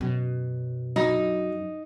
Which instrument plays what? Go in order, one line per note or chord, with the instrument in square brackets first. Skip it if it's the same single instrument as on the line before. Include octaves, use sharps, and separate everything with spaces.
[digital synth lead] F#2 [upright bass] B2
[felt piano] F#3 [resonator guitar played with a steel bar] D#4